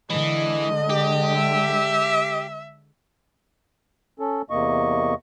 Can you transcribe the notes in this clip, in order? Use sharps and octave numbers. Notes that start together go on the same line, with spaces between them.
D3 E3 G#3 D#5
G4
E5
C#4 A4
E2 C3 A#3 D#5 C#6